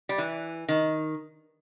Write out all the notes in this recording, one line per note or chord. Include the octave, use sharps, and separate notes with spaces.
G3
E3
D#3